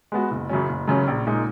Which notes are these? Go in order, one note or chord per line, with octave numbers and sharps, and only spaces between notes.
G#3 B3 F#4
F#1
F#2 C#3 F#3 C#4
F#1
F#2 C#3 F#3 C#4
A#1
A#2 G#3 D#4